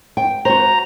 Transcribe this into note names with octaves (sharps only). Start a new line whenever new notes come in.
G5
F#4 C5 A#5